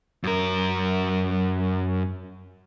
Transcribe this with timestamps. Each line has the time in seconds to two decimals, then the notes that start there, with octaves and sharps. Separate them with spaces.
0.24 F#2 A#4